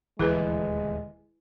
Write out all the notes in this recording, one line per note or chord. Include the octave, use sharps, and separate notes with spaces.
D#1 D2 B2 E3 G#3 E4 G#4 B4